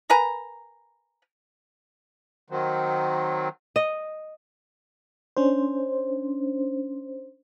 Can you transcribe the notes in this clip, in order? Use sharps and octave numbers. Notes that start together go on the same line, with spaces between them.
A#4 B4 G#5 A#5
D#3 F#3 C4
D#5
C#4 D4 C5